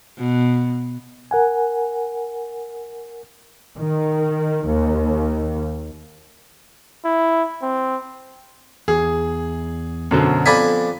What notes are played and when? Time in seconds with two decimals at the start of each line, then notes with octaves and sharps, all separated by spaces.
0.17 B2
1.31 A#4 F#5 G#5
3.78 D#3
4.68 D#2
7.05 E4
7.62 C4
8.88 E2 G#4
10.11 F#2 B2 D3 B3 A4 C5
10.46 F2 D4 G#5 B5 B6